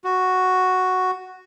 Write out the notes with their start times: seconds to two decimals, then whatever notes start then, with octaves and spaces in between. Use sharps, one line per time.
0.04 F#4